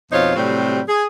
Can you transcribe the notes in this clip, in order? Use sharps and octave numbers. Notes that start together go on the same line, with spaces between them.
F2 B2 D#4 F4 C5 C#5
A2 C3 F#3 G3 C4
G#4